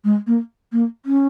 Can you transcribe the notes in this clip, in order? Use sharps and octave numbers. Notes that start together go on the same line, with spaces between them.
G#3
A#3
A#3
C#4